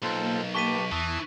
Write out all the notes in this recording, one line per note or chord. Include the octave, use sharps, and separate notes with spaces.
B1 A#3 F4 A4 C5
G4 B4 A5 C#6 B6 D#7
E2 E3 E5 A5 D#6